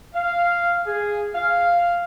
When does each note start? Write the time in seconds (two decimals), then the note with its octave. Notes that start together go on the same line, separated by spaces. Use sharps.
0.14 F5
0.86 G#4
1.35 F5